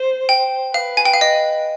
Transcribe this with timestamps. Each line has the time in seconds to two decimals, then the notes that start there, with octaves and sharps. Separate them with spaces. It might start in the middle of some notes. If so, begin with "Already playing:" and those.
Already playing: C5
0.29 G5
0.74 B4 F5
0.97 G#5
1.05 G5
1.13 F5
1.21 D#5